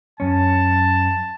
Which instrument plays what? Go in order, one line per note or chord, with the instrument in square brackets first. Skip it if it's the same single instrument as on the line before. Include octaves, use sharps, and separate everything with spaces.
[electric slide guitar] F#2 C#4 [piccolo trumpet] A5